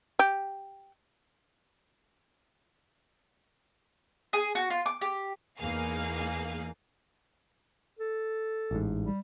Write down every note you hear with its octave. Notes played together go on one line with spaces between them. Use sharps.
G4
G#4
F#4
F4
D6
G4
E2 A#3 D#4 G#4 F5
A4
A1 G#2
G3